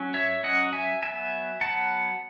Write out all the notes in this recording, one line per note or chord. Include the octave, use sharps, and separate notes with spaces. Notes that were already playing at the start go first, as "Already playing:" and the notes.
Already playing: F#3 C#4
C#5 E5
F#3 C#4 D#5 F#5
E5 G#5
F#3 B3 E5 G#5
F#3 B3 F#5 A5